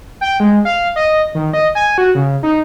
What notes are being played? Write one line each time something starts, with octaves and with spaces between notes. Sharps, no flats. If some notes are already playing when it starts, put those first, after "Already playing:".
G5
G#3
F5
D#5
D#3
D#5
G#5
F#4
C#3
D#4